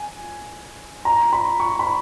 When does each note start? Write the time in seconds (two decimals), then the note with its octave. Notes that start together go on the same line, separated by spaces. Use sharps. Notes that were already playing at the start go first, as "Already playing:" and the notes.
Already playing: G#5
1.05 A#5
1.33 B5
1.60 C#6
1.79 B5